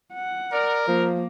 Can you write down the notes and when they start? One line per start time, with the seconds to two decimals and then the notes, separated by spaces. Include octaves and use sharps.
0.14 F#5
0.53 A#4 D5
0.87 F3 A#3